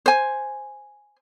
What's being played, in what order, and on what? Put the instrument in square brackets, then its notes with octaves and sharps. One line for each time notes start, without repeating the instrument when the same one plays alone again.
[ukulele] C5 G#5